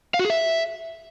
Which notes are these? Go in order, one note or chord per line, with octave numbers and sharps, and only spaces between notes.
F5
F#4
G#4
E5